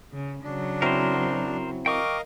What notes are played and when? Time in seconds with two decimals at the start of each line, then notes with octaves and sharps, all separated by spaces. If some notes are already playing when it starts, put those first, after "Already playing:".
0.13 C#3
0.44 C#3 F#3 D4
0.82 C4 E4 F#4 A#4 C5
1.86 A#4 D#5 F5 G5 C#6 D6